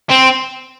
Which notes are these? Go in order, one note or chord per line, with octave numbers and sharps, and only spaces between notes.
C4